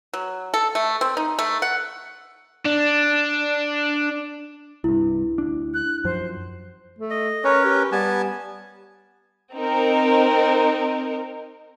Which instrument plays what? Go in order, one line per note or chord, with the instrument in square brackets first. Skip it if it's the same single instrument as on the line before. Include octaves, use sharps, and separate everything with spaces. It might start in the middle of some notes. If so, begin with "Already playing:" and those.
[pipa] F#3
A4
A3
C4
D#4
A3
F#5
[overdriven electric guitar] D4
[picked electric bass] C2 G2 [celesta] E4
[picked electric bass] D2 D4
[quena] F#6
[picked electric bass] F#2 F3 [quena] C5
[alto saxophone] A3
[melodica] D#5
[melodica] C#4 A#4 B4 [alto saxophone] C#5
[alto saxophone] G4
[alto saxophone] G3 [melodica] B3 G#5 A5
[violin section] C4 D#4 A#4